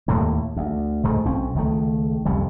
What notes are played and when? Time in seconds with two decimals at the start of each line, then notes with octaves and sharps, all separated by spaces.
0.08 D#2 A2 A3 A#3
0.56 D2
1.03 C#2 G#2 A3
1.25 B1 C4 C#4
1.55 C#2 D#3 A3
2.25 C2 F2 C#3 G3